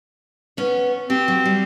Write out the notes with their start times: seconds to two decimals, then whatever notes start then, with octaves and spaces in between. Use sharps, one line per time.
0.57 B3 C#4 C#5
1.10 C4 G4
1.28 F#3
1.45 G3